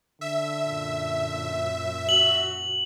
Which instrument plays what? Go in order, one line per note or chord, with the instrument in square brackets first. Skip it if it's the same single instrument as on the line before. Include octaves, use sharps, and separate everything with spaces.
[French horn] D3 [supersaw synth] E5
[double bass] F#2 A#2
[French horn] F#4 [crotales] F#7